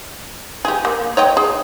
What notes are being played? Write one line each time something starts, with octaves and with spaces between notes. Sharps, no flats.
G4 G#4
A#3
C#5 D#5 G5
G#4